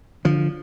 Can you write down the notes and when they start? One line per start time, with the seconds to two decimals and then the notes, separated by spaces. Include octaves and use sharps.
0.25 D3 F3